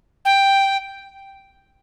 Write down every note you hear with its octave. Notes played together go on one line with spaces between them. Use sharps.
G5